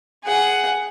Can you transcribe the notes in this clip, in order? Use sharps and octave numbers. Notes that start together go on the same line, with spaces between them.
G#4 F#5